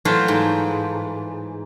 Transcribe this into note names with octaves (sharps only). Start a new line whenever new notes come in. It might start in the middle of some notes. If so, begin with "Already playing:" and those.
E3 F#3 A3 F4 C5
G#2